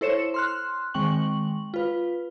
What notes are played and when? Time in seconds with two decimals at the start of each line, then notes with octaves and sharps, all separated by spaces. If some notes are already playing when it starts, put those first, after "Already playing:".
0.01 E4 A4 C5 C#5 C#7 E7
0.34 C6 F6 F#6
0.94 D#3 G#3 C4 G5 C#6 F#7
1.74 F4 B4